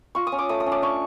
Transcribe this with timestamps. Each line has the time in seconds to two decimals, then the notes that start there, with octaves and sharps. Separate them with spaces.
0.15 F4 C#6
0.27 D#6
0.32 C#4
0.38 D6
0.49 A3 D#6
0.60 D#6
0.66 C#4
0.72 D6
0.82 D4 C#6